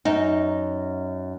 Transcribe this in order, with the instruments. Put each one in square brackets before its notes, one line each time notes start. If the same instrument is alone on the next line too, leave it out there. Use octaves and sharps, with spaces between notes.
[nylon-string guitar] F#2 D#4